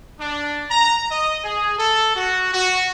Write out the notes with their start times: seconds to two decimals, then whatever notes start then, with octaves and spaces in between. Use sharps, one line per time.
0.20 D4
0.71 A#5
1.11 D#5
1.44 G#4
1.79 A4
2.15 F#4
2.54 F#4